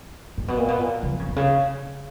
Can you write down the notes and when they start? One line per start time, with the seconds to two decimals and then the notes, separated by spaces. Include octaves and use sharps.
0.38 A#2
0.48 B2
0.57 A#2
0.68 B2
0.78 A#2
1.03 C#3
1.12 F3
1.19 C#3
1.28 B2
1.36 C#3